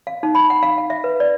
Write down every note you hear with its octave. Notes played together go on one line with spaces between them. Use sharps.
F5
D#4
B5
F#5
F5
F5
E5
B4
D5